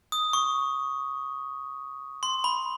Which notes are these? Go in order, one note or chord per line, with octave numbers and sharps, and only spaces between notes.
D#6
C#6
C6
B5